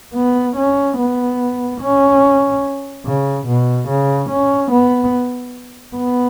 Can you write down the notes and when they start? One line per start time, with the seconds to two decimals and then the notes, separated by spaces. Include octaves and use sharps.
0.14 B3
0.57 C#4
0.98 B3
1.81 C#4
3.05 C#3
3.47 B2
3.88 C#3
4.30 C#4
4.72 B3
5.96 B3